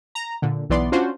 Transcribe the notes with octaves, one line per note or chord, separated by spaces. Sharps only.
A#5
A#2 D3
B1 E3 B3 D5 C6
C#4 D4 F4 F#4 C5